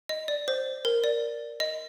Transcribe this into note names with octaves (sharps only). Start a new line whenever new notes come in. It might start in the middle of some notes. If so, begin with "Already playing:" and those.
D#5
D5
C5
A#4
D5
D#5